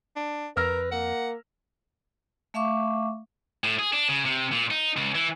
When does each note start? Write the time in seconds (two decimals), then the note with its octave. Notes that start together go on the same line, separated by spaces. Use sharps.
0.16 D4
0.57 F2 A#4 B4 E6 F6 A#6
0.92 A#3 F#5
2.54 A3 E5 F5 C#6 D6
3.64 A2
3.79 G#4
3.93 D4
4.09 C#3
4.25 C3
4.52 A#2
4.71 D#4
4.97 C#2
5.15 E3